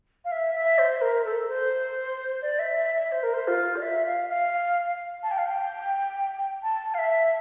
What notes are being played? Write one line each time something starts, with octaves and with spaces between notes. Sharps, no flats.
F5
E5
E5
C5
A#4
A4
C5
D5
E5
E5
E5
C5
A#4
C5
F4
D5
E5
F5
F5
A5
G5
F5
G5
A5
F5
E5